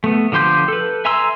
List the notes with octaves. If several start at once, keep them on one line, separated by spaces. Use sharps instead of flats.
A3 B3
D3 F3 G4 C6 G6
A4 B4
E5 G#5 A#5 C6 E6